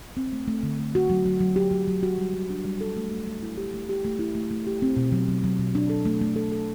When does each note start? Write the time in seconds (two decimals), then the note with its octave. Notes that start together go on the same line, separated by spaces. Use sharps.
0.17 C4
0.33 A3
0.48 A3
0.63 D3
0.80 A3
0.95 F#4
1.10 F#3
1.26 F#3
1.40 F#3
1.56 G4
1.72 F#3
1.87 F#3
2.03 F#4
2.18 G3
2.34 G3
2.50 D4
2.65 G3
2.81 A4
2.96 A3
3.11 A3
3.27 A3
3.42 E4
3.57 G4
3.74 A3
3.89 G4
4.05 A3
4.19 E4
4.35 A3
4.51 A3
4.67 G4
4.82 C4
4.97 B2
5.12 F#3
5.28 F#3
5.44 F#3
5.59 B2
5.75 D4
5.90 A4
6.05 A3
6.21 A3
6.36 A4
6.52 A4